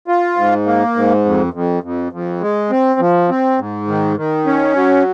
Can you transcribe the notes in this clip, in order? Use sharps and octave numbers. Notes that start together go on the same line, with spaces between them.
F4
G#2
A#3
G#2
F2
F2
F2
F2
G#3
C4
F3
C4
G#2
D#3
D#3
C#4
F#3